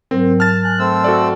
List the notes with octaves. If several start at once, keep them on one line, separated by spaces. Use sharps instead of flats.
G#2 F#3 C4 A#4
A5 F6 A6
G#5 F#6
A3 C4 E6
F#4 A4 D5